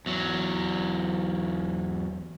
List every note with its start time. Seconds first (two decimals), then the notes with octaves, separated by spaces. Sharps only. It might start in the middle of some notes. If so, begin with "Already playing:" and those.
0.06 E2 F#3